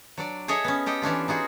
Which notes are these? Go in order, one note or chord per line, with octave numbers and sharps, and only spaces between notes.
F#3 D4 D5
G#4 A4 C#5 D#5 E5
B3 C#4
G4 A4 D#5 G5
E3 C#4 D4 F4
D#4 F4 F#4 G#4